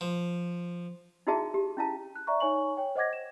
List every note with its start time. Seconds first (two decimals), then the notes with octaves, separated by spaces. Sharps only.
0.01 F3
1.27 D#4 E4 F#4 G#4 E5 A5
1.54 G4
1.77 C#4 E4 F5 A5
2.15 F#6
2.27 D5 E5 A#5 C#6
2.40 D#4 C#5 G#5 C#6 F#7
2.77 C#5 G5
2.96 C5 D#5 F#5 D6 G#6 A#6
3.13 E7